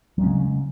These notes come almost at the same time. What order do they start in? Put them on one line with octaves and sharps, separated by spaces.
F#3 G#3 C#4 C#3